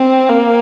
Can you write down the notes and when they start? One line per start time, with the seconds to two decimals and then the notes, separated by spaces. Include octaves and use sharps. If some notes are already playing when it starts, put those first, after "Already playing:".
Already playing: C4
0.29 A#3